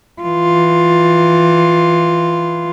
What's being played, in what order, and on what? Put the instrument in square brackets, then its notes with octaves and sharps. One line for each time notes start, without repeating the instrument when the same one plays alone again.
[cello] E3 F4